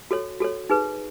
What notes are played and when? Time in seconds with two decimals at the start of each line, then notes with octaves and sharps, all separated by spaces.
0.11 F#4 A4 C#5
0.40 F#4 A4 C#5
0.70 D#4 G#4 B4